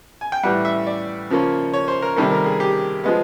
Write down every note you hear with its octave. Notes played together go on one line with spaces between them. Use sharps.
G#5
G5
A2 E3 G3 F#5
E5
D5
C#3 F3 A#3 C#4
C#5
C5
A#4
C3 D#3 G3 A#3 A4
A#4
G#4
G4
F3 G#3 B3